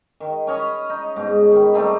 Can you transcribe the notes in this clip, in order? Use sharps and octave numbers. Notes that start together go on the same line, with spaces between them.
D#3
C#4 C#5 D#5 B5
D#4
G#2 B2
D#3 B5
G3 A3 C4 D#4